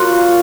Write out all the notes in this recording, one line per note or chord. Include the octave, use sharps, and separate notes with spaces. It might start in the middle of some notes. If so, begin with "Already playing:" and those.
Already playing: F#3 A#3 F4 F#5